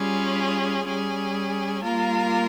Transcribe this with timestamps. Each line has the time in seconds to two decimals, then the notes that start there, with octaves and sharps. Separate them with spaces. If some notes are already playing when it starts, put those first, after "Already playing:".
Already playing: G3 C#4 F4 G#4
0.85 G3 C#4 G#4
1.82 G3 A#3 F4 A#4